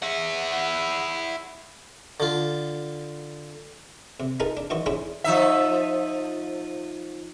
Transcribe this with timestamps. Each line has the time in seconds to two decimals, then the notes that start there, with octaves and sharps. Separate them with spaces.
0.02 E4 F#5
2.20 D3 F4
4.20 C3
4.40 D#4 F4 G#4 A#4 B4 A5
4.57 D4
4.70 D#3 E3 F#4 C5 D#5
4.86 C#4 D4 E4 G#4 C5 B5
5.24 F3 D#4 E5